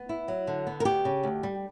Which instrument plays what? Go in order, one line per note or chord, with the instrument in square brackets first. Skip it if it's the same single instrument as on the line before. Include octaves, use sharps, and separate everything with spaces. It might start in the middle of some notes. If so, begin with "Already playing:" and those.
Already playing: [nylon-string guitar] B3
E4
F#3
D3
B3
A#4
D2 G4
C#3
D2
G3